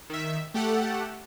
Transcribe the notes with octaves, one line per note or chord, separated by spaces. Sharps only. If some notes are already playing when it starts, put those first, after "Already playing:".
D#3 E5
A3 G4 A4 F#5